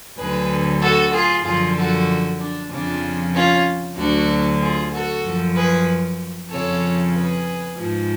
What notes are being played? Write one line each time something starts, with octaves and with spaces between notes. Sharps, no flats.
D2 D3 F#3 G#4 B4
F#4 A4
F4 G#4
F#2 D3 F3 F4 G#4
F#4 A4
D4
F2 C#3 F3 D4
C#4 F4
D2 D3 F#3 D4 F#4
F4 G#4
F#4 A4
F#2 F3
G#4 B4
F2 C#3 F3 A4 C#5
G#4 B4
G#2 F3